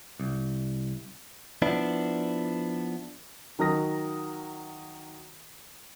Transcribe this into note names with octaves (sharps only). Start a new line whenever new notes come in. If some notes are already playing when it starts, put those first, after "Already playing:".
C2
F3 B3 D4 E4
D#3 F#3 A#4 D#6 A#6